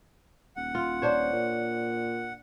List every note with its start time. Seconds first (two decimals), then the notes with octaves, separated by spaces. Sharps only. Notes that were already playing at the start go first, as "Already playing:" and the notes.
0.56 D#1 F#5
0.75 F4
1.02 D4 C5 C#5
1.32 A#2